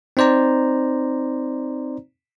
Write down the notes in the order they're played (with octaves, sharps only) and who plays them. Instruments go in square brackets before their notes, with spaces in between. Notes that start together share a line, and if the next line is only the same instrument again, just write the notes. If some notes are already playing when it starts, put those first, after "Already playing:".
[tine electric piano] C4 D#4 C5 D5 A#5